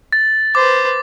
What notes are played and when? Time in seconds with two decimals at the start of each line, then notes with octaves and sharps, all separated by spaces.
0.13 A6
0.55 B4 C5 D6